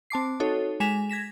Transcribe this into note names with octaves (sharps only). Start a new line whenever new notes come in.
C4 A5 D6 C7
D#4 F#4 A4 C#5
G#3 G#5 B6 E7 F7
G#6 A#6 B6 E7